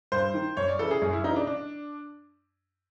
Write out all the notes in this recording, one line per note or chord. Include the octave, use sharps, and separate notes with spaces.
G2 C5
D#3
F#2 C#5
D5
C#3 E3 A4
G#4
F#2
E4
C#3 E3 D#4
D4
D4